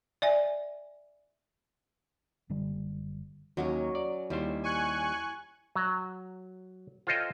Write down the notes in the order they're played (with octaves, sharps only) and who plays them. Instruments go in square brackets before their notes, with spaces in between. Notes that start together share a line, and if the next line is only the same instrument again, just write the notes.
[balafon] D5 E5 G#5
[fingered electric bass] F#1 D3 G3
[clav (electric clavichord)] D#2 [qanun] F#3 C#4 A#4
[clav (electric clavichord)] D5
[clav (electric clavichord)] D#2 G3 C5 [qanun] E4
[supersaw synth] G#5 C#6 F#6
[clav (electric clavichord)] F#3
F4 A4 C5 C#5 D#5 G5